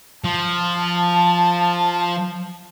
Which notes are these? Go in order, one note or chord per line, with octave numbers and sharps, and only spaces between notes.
F3 A5